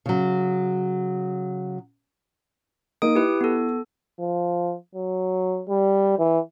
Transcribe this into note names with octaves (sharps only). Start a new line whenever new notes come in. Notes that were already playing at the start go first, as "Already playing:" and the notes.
C#3 F#3
A#3 D#4 D#6 D7
E4 G4 B4
B3 A4
F3
F#3
G3
E3